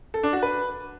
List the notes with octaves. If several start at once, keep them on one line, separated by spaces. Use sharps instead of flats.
A4
D4
F#4
B4